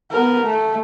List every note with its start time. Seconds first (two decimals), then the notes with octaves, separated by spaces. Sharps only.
0.11 B3 A#4
0.44 A3